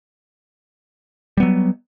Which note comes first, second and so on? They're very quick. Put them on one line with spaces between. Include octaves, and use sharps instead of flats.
G3 B3 F#3